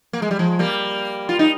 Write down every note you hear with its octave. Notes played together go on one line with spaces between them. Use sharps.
A#3
G#3
G3
F3 G#3
G3 A#3
F4
D#4